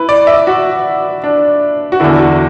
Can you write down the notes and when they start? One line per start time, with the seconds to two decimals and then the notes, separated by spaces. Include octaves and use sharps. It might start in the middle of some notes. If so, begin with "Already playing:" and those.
Already playing: E4 B4
0.09 D5
0.27 E5
0.47 F#4
1.24 D4
1.92 F#4
2.00 E2 D3 E4
2.19 F#4